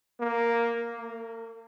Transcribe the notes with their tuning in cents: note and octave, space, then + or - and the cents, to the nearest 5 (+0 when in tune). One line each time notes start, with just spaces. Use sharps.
A#3 +0
A#3 -40